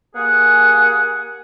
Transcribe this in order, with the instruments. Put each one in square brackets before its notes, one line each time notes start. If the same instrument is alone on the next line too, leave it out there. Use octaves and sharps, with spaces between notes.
[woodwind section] A#3 G4 G#4 F#5 G#5